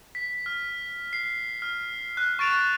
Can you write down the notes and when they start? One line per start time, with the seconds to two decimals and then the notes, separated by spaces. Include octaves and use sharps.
0.15 B6
0.46 F6
1.13 C7
1.62 F6
2.17 F#6
2.39 C#6 A6 D7 E7 F7